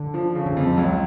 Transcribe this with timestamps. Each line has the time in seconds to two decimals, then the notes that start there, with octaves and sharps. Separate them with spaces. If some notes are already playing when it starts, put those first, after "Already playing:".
Already playing: D3
0.14 F3
0.35 C#3
0.46 D3
0.57 F2 D3
0.67 F3
0.77 C#2 F#3